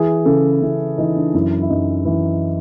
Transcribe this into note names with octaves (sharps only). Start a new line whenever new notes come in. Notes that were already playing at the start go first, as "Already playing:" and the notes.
Already playing: E3 G#4
C#3 A4
C#3 E4
E3 D#4
D4
F#2 E4
E4
F#2 D#4
E3